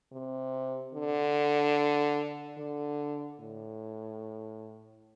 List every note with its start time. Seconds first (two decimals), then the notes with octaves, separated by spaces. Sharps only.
0.13 C3
0.94 D3
2.58 D3
3.40 A2